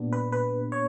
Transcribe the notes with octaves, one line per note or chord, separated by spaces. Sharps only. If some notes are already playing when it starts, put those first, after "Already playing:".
Already playing: A#2 G3 B3 D4
B4
B4
C#5